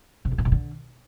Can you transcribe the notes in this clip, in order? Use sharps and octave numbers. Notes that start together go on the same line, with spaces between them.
C3
E2
A2
B2
D3